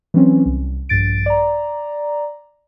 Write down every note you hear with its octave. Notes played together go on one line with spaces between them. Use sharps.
E3 F#3 C4 C#4
C2
A#1 G2 A6 D7
D5 A#5